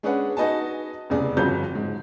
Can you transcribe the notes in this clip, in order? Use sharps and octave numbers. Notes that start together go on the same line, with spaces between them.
G#3 C#4 D4 G#4 B4 F#5
D#4 F#4 B4 D#5 G#5 A5
F1 E2 C#3 G#4 D5
G1 F2 C#3 F3 F#3 G6
G#2